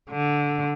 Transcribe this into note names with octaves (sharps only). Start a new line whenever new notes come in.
D3